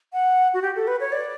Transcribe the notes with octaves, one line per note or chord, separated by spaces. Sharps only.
F#5
F#4
G4
A4
B4
C#5
D5